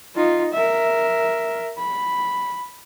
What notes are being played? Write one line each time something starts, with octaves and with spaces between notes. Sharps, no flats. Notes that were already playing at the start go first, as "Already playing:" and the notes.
D#4 F4
A#4 E5
B5